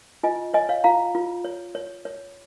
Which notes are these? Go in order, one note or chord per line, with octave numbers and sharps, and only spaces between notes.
F4 D#5 G#5
C#5 D#5 G#5
C#5 F5
F4 F5 A#5
F4
C#5
C#5
C#5